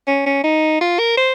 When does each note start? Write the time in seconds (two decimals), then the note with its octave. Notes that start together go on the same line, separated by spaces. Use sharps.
0.07 C#4
0.26 C#4
0.44 D#4
0.81 F4
0.99 A#4
1.17 C5